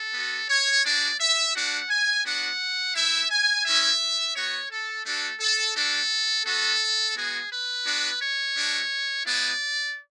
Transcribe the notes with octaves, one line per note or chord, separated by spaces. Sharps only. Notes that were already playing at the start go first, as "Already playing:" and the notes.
Already playing: A4
B3 F#4
C#5
G#3 D4 F#4 D5
E5
A3 D4 F#4 F#5
G#5
B3 D4 F#4 F#5
A3 E4 E5
G#5
G#3 C#4 E4 E5
B3 F#4 C#5
A4
A3 D4 F#4 A4
A4
A3 D4 F#4 A4
B3 F#4 A4
G#3 B3 F#4 G#4
B4
B3 D4 F#4
C#5
A3 D4 F#4
G#3 B3 E4 D5